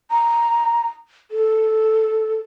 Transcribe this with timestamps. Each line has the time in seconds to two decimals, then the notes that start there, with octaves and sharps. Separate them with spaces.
0.11 A#5
1.31 A4